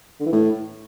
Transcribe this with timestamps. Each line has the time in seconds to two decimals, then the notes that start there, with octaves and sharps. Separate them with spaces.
0.20 D3
0.26 E3
0.32 A2